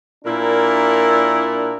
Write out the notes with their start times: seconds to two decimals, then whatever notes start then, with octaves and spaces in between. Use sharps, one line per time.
0.25 A#2 D4 E4 A#4